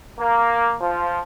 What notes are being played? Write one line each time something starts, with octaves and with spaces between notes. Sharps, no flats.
A#3
F3